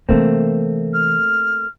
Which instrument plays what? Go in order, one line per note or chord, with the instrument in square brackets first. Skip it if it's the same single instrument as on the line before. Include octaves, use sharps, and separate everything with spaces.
[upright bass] C3 E3 [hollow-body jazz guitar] A3 A#3 C4
[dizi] F6